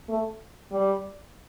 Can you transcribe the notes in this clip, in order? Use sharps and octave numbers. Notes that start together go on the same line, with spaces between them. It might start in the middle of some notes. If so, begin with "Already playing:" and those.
A3
G3